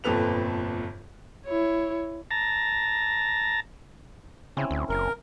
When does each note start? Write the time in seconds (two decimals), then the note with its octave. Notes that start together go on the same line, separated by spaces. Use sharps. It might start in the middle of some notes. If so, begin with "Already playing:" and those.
0.04 G1 F2 A#2 A4 B4 F7
1.46 E4 C#5
2.31 A5 A#5
4.57 C#3 C4 C#4 E4
4.71 D2
4.89 F#1 A#4